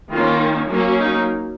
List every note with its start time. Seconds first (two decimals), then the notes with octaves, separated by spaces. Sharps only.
0.12 D#3 A#3 C#4 F4
0.69 F#3 A#3 C#4 D#4
0.99 D#4